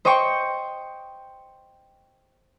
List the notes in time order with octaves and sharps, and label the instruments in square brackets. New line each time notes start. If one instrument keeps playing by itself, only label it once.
[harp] C5 D#5 G5 C#6